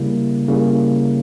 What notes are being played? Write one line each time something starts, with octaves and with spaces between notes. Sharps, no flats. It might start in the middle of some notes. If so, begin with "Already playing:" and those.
Already playing: C#3 G3 A#3 E4
C#3 G3 A#3 E4